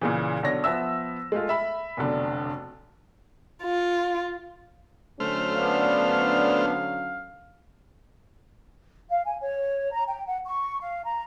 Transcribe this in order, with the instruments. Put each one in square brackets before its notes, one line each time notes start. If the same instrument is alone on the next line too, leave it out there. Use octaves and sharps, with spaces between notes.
[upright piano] A#2 C#3 E3
B1 D3 C#5 A#6
F3 B3 E5 E6
G#3 A3 F4
E5 B5
F1 B1 D3
[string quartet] F4
[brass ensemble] D3 F#3 C#4 [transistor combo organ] A3 C5 F6
[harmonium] B3 D4 [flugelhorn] F5
[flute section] F5
G#5
C#5
A#5
G5
F#5
C#6
F5
A#5